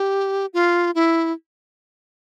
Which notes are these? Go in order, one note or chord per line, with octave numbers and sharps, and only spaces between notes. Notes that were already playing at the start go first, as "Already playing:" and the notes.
Already playing: G4
F4
E4